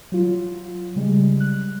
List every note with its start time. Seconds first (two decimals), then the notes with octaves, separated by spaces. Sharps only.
0.12 F#3 F4
0.96 C#3 G3 G#3
1.40 F#6